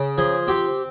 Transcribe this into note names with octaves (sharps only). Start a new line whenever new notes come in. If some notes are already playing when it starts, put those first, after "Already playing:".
Already playing: C#3
F3 G#4
C4 G4